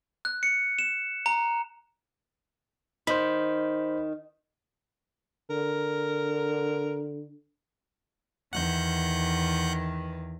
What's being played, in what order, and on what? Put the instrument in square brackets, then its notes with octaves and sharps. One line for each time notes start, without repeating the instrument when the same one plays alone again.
[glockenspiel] F#6
C#7
E7
A#5
[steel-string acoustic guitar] D#3 [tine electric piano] C5 B5
[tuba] D3 [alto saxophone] A#4
[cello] E2 D#3 [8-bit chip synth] F#5 F#6 G6